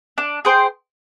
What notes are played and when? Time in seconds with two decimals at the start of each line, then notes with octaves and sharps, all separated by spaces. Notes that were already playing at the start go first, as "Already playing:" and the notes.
0.18 D4
0.45 G#4 C5 G5